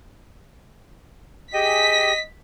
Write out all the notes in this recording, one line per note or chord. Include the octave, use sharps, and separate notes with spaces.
G4 G#4 D#5 G5 B6